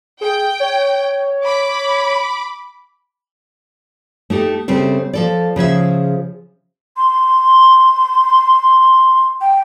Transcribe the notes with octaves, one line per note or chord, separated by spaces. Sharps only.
G#4 G5
C#5
B5 D6
A3 D#4 G4 A4
C#3 G3 C4 A4 E5
F3 A4 D5
C#3 F3 G#4 E5
C6
G5